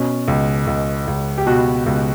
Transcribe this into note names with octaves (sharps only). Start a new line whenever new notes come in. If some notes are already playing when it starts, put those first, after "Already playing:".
Already playing: B2 C#4
C#2
C#2
C#2
G4
B2 F#4
C#2